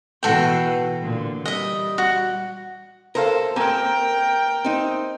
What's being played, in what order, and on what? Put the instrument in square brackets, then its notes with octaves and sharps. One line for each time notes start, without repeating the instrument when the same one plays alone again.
[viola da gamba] B2 E3 [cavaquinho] F#4 A4 G5
[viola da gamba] A#2 D3
[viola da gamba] G3 [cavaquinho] D#5 E5
[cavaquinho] F#4
[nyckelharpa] A4 [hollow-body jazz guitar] A#4 C5 F5
[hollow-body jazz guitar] A#3 C4 G#5 [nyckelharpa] A#4 G5
[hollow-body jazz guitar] C4 D#4